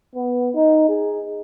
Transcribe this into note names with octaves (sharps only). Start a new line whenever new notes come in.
B3
D#4
G#4